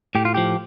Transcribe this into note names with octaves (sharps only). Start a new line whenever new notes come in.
A2 G4
F4
F3 G4